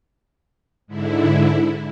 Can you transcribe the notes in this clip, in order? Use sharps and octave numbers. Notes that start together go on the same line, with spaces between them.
G#2 D3 E4